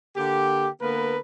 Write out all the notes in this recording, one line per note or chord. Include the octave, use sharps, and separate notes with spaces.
D3 A#3 G4
D3 A#3 B3 A#4 B4